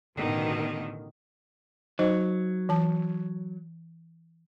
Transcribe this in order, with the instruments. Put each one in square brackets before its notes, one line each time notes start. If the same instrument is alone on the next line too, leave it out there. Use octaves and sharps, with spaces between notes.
[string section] A1 B2 D3 D#3
[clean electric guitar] F#3 [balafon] D#4 C5 D#5
[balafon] E3 A5